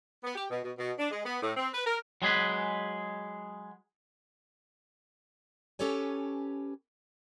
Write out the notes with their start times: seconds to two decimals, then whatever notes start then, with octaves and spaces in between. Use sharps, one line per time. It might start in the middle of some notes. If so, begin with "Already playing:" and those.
0.24 B3
0.35 G4
0.50 B2
0.62 B2
0.78 B2
0.99 D4
1.11 G#3
1.25 B3
1.41 A2
1.56 C4
1.73 B4
1.86 A#4
2.22 F#3 G#3 G#4 B4
5.79 C#4 G4 A4 B4 C#5 G#5